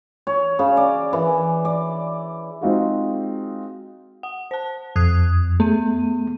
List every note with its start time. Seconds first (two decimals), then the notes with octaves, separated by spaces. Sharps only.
0.27 C#5
0.59 C#3
0.77 D5
1.13 E3
1.65 D5
2.61 G#3 C4 D#4 F4 F#4 G#4
4.23 F#5
4.51 C5 A5
4.96 F2 D#6 F#6 G#6
5.60 A3 B3 D#7